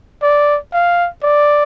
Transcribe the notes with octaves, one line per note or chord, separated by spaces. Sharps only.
D5
F5
D5